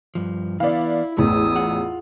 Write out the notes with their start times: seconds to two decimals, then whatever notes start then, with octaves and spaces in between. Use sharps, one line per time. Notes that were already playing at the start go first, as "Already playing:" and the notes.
0.15 G2 F3
0.60 E3 B3 E4 D5 F5
1.18 A1 E2 A3 D#6 E6
1.56 F4 F#5